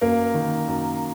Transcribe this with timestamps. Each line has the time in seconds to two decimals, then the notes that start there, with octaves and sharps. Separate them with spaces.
0.01 F#2 A#3 A#4
0.34 D#3
0.68 F#2